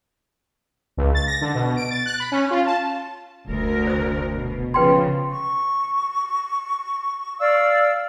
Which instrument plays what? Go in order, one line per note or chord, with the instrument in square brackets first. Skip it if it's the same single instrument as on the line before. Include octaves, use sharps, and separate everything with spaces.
[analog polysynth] C#2
A6
A#6
D3
B2
D7
A6
F#6
B5
C#4
F4
A5
[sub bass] F1 [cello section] D2 A#4
[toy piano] C5 D#6
[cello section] B2
[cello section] C#3 F3 [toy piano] B4 G5 C6
[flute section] C#6
D5 F5 E6